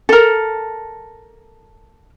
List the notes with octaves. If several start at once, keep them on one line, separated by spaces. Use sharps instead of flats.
A4 A#4